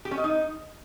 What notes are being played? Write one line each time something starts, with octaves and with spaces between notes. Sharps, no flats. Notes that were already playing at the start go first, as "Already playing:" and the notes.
G4
C#4
D#5
D#4